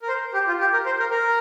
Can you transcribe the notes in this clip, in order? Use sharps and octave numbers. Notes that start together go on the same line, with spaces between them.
A#4
C5
G4
F4
G4
A#4
C5
A#4
A#4